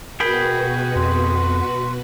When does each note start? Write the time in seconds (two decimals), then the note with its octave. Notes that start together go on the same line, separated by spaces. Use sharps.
0.20 B2 F#4 G#4 A#4 B4 G5 B5
0.96 F2 C6